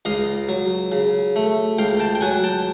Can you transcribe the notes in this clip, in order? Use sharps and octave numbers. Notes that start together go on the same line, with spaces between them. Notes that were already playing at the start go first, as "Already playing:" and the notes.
C#2 D#5 F5
F#3
C#3
A3
C#2 F5 G5
G5 A5
G5
F#3 F#5 G#5
G5 A5